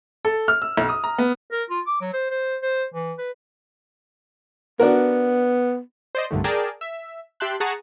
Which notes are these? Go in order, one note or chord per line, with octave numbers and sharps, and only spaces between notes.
A4
F6
E6
B1
D#6
A#5
B3
A#4
F4
D6
F#3
C5
C5
C5
E3
B4
B3 D4 F#4 A#4
C5 D5 D#5
C2 G2 D3 D#3 A3
G#4 A#4 D5 G5 A5
E5
G4 E5 G5 A5 C6 F#6
G#4 F#5 A5 A#5 C#6 D#6